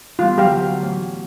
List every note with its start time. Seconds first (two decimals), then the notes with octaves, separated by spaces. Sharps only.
0.19 E3 G3 B3 F4
0.38 D2 F#3 G4 F5
0.80 A2 E3